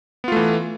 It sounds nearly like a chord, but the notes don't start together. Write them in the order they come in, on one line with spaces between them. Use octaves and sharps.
B3 F4 A3 E3